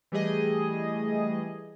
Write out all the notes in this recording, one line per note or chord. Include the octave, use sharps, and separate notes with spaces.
E3 G3 A3 G#4 D#5